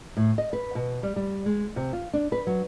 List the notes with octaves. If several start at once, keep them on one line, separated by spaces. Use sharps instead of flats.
A2
D#5
B4
B2
G3
G3
G#3
C3
F4
D4
B4
F#3